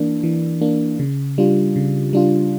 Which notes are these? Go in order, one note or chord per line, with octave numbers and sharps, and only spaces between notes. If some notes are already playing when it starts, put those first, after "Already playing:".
Already playing: E3 A#3 D4
E3
A#3 D4
C#3
G3 D4 F4
C#3
G3 D4 F4